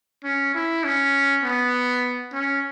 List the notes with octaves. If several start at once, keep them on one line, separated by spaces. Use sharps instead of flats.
C#4
E4
C#4
B3
C#4